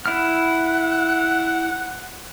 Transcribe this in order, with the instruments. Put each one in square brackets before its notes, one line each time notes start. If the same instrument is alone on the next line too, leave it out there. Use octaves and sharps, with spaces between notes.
[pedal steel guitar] E4 F6 [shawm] F#5